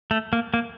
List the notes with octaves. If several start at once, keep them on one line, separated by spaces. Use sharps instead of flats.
A3
A#3
A#3